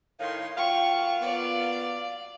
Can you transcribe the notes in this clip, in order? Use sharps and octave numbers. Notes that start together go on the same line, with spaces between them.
A2 D#3 C#5 F5 C6
F#3 A#3 F4 F5 G5 C#6
B3 D5 F5